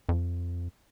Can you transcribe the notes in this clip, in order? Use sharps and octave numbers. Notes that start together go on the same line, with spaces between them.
F2